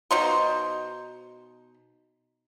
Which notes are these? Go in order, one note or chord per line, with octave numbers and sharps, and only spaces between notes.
B2 D#4 C5